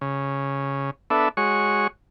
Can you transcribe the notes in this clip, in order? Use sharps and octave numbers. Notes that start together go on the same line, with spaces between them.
C#3
B3 D4 A4 E5
G#3 F#4 C#5 C#6